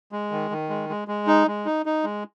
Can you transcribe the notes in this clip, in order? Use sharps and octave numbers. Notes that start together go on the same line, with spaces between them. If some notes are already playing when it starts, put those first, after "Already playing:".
G#3
D#3
D#3
G#3
G#3
G#3
D#4
G#3
D#4
D#4
G#3